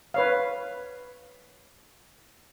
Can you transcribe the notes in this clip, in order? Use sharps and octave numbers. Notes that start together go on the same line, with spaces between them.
B4 C#5 F5